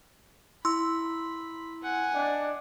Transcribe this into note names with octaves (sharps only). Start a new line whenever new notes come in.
E4 B5 C6 E6
F#5 G#5
D4 D#5 G5